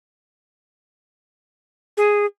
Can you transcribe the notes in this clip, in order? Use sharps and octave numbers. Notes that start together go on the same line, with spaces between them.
G#4